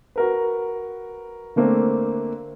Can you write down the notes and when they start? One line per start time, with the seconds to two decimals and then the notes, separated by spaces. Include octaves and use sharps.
0.16 F#4 A#4 B4
1.56 D3 A3 A#3 C4 D4